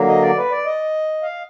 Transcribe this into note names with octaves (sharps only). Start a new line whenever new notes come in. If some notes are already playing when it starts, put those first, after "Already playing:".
Already playing: D3 F#3 A#3
D#5
D5
B4
D5
D#5
F5